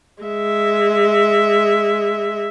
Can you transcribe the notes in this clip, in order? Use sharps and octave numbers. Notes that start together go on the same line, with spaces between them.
G#3 E5